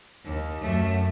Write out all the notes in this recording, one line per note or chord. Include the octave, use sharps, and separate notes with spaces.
D#2
F#2 A3